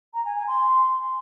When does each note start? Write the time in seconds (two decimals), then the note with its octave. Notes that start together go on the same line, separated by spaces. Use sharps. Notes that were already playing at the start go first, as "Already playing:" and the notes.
0.14 A#5
0.25 G#5
0.36 G#5
0.48 C6